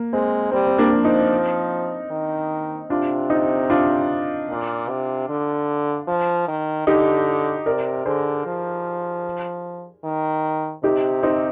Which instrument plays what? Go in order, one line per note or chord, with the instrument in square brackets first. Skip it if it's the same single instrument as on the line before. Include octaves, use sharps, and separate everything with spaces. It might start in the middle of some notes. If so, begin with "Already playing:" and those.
Already playing: [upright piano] A#3
[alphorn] G#3 [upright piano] C4
[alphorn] G3 [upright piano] C4
[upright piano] C4
A#3 D4
[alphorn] F3
[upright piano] C4 D#4
[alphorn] D#3
[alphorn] C3 [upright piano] D4 F4
[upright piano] C4 D#4
D4 F4
[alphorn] A#2
C3
D3
F3
D#3
[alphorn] D3 [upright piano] D#4 G4
[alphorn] C3 [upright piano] A#4 D5
[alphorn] D3 [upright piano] G#4 C5
[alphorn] F3
D#3
[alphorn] C3 [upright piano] D#4 G4
[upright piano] C4 D#4